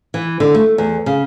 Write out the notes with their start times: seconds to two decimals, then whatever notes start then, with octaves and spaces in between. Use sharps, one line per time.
0.14 E3
0.40 D3
0.55 A3
0.78 E2
1.06 C#3